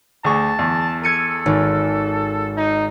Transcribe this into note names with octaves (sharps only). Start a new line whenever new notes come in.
D2 G#4 A5 C#6
E2
A4 G#6 C#7 D#7
G#1
D#4